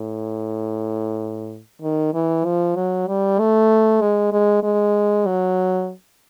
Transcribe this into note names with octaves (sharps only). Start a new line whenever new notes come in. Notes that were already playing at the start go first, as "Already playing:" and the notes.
Already playing: A2
D#3
E3
F3
F#3
G3
A3
G#3
G#3
G#3
F#3